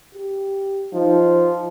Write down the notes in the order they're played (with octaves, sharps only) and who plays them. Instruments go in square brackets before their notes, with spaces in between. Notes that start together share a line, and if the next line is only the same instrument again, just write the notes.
[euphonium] G4
[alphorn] F3 [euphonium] D#4